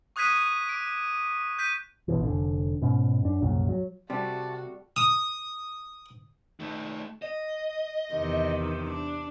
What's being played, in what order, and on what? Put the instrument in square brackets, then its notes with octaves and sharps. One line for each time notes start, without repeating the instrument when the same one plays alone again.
[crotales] C#6 D#6 F#6 G#6 B6 D#7
D6 D7
G6 B6 D#7
[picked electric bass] A1 B2 E3
F1 D3
G#2 B2 C#4
F#2 D4
C2 F#2 A#2 C#3
F#3
[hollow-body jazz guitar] C3 [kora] G3 A3 [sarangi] F#4 [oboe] A5
[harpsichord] D#6
[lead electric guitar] D#3 A3
D#5
[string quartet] E2 C3 D#3
D4